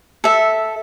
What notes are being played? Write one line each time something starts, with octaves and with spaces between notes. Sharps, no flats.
A4 E5